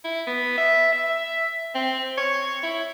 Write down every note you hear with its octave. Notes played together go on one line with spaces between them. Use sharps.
E4
B3
E5
E5
C4
C#5
E4